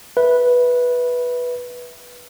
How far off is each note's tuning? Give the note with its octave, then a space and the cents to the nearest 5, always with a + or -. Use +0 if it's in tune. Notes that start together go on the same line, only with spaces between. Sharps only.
B4 -10 E5 -10